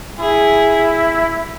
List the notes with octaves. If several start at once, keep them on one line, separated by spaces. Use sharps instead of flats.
E4 G#4